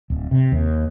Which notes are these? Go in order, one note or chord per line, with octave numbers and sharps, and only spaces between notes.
D1
C3
D#2